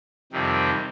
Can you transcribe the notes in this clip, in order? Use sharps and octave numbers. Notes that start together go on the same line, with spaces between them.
F2 C3 D#3 G3